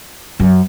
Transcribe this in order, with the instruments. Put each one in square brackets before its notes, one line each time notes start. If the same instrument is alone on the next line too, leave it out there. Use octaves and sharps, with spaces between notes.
[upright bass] F#2